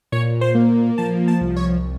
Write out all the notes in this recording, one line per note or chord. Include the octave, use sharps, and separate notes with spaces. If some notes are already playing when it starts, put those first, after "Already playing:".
A#2 C#5
C5
A#3
F3 A5
A5
C2
C#5